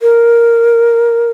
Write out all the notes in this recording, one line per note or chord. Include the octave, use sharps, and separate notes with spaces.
A#4